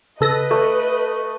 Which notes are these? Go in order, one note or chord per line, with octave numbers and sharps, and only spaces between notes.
C#3 A4 B4 D#5 A#6
A3